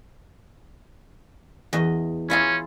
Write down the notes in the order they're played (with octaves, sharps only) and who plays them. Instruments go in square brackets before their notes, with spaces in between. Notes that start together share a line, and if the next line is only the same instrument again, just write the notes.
[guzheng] E2 D#5
[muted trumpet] C#4 [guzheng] E4 F4 G#4